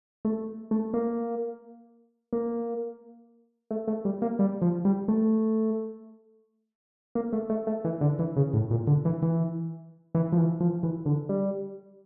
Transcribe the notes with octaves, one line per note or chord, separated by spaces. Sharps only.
A3
A3
A#3
A#3
A3
A3
G3
A#3
G3
F3
G3
A3
A#3
A3
A3
A3
E3
D3
E3
C#3
A2
A#2
D3
E3
E3
E3
F3
E3
F3
E3
D3
G3